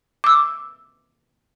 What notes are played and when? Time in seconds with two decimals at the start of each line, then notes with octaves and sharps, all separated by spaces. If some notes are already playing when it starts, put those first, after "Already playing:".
0.24 D6 E6